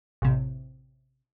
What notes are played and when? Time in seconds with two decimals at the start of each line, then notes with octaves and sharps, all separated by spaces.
0.22 A1 C3